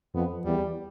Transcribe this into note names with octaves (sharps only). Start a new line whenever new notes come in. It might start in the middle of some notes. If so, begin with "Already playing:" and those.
F2 B3
E2 G3